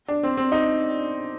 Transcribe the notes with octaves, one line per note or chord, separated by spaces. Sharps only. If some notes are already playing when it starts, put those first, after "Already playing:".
D4
C4
C4
D#4